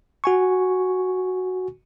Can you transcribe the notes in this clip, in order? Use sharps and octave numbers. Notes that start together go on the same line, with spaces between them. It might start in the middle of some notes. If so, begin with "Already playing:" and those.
F#4 G#5 C#6